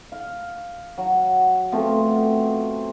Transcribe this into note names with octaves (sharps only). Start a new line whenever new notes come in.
F5
F#3
B2 F3 A3 C4